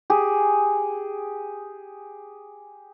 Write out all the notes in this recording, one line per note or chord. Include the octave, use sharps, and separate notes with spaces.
G4 G#4